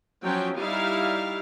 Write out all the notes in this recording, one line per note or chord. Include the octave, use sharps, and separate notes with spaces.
F3 F#3 C#4 G5
G3 D#4 E4 F5